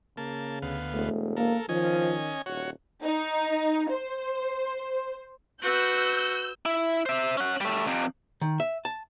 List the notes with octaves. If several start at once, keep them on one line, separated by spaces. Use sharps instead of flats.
C#3 A#3 A5
D2 B3 F5
E1 A3
A#3 A4 A#4
D#3 F3 C#4 D#5 G#5
D#1 F#4 C#5
D#4
C5
F#4 B4 E6 G6
E4
C5 E5
C#4 F#5
G3 A3
F2 C3
D#3
E5
A5